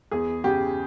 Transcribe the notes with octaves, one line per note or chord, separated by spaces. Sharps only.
E2 G#4
C#3 G4